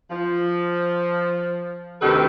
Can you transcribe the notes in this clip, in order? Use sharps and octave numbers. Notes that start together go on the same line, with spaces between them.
F3
D2 C3 D#3 G4 A4 B4